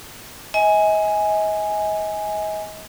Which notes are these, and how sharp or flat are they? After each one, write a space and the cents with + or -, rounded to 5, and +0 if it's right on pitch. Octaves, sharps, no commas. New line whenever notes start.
D#5 +40 G#5 +0